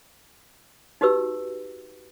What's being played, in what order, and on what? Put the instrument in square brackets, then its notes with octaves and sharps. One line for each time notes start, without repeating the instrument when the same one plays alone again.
[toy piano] D#4 F#4 G4 B4 E6